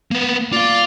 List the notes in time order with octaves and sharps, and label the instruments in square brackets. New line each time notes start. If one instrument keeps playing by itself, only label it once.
[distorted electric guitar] A#3 B3
[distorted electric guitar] F4 F5 [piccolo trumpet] D5